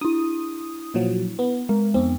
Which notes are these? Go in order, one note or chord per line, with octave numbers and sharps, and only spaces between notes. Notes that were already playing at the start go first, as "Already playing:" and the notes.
D4 E4 D#6
A#2 F3 F#3
B3
G#3 A#4
F2 B3 C4